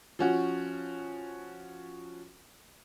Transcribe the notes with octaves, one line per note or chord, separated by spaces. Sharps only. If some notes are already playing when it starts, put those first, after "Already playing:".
F3 C#4 F#4